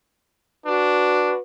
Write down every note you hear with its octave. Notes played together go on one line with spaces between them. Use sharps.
D4 F#4 B4